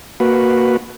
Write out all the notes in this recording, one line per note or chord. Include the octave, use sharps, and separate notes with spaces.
A#3 F#4 B4